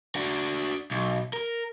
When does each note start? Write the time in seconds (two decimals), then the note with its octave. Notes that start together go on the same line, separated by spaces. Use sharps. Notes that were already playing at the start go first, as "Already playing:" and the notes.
0.16 D4 F#4
0.91 B1
1.33 A#4